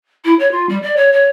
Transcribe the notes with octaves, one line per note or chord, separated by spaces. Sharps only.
E4
C#5
F4
G3
D5
C#5
C#5